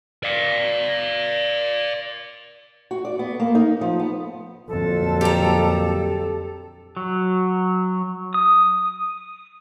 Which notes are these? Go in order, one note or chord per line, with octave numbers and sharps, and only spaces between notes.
D5 F5
F#4
D5
B3
A#3
D#4
F3
B3
F2 A#2 D3 F#3 A4
G4 A#5
F#3
D#6